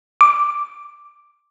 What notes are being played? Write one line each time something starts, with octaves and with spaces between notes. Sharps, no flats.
D6